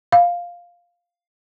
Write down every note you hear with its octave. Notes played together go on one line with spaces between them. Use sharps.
F5